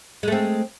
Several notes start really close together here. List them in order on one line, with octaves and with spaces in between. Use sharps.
G#3 A3 C4